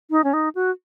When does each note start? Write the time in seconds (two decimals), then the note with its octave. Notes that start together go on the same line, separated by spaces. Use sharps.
0.11 D#4
0.24 C#4
0.33 D#4
0.55 F#4